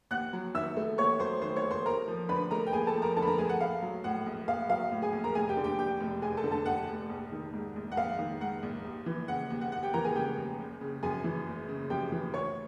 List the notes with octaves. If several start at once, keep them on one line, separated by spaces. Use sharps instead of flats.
D#2 F#5 F#6
F#3
D#3 E5 E6
A3
D#2 C#5 C#6
F#3 C5 C6
D#3 C5 C6
C#5 C#6
A3
C5 C6
D#2 A#4 A#5
F3
D3 B4 B5
A3 A#4 A#5
G5
D#2 G#4 G#5
A4 A5
F3
A#4 A#5
D3 A4 A5
B5
A#4 A#5
A3 G#4 G#5
F#5
A#1 F5
F#3
A2 F#5
A#1
A#1 F5
F#3 F5
A2
G#4 G#5
A#1
A#4 A#5
F1 G#4 G#5
G4 G5
D3
G4 G5
D#2 G4 G5
F1
F1 G#4 G#5
A4 A5
D3
A4 A5
D#2 F#5
F1
A#1
D#3
G#2
A#1
F#5
A#1 F5
D#3
G#2 F#5
A#1
D#2
E3
C#3 F#5
D#2
F#5
D#2 F#5
G4 G5
E3 A#4 A#5
G#4 G#5
C#3 G4 G5
D#2
F#1
C#3
F#2 G#4 G#5
E3
F#1
C#3
F#2 G4 G5
E3
D2 C#5 C#6